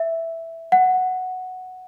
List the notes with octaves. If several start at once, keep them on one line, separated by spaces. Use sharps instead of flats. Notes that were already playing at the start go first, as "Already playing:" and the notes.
Already playing: E5
F#5